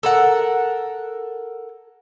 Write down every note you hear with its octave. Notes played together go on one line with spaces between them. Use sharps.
A4 A#4 F#5